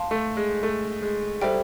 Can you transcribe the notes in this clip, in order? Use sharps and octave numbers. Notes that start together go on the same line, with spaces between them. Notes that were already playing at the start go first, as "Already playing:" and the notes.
Already playing: F5 A5 C6
A3
G#3
A3
G#3
G3 A4 C5 E5 G5